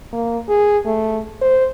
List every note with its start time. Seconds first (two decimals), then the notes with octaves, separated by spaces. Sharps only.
0.13 A#3
0.49 G#4
0.86 A3
1.41 C5